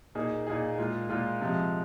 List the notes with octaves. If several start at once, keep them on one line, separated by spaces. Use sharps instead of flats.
A#2 A#3 D#4 G#4
A#2 A#3 D#4 G#4
A#2 G#3 F4
A#2 G#3 F4
C3 F3 G#3